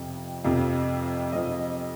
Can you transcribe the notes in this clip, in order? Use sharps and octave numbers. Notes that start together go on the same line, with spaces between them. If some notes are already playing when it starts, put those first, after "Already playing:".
Already playing: F2 C3 F3
F2 C3 F3
F2 C3 F3 D#5